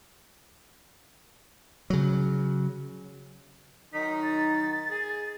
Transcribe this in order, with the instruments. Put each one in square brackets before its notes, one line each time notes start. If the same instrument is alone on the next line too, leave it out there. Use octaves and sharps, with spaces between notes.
[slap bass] C#3 F#3
[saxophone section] D#3 F#3 D#4 [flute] B6
[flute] A6
[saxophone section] G#4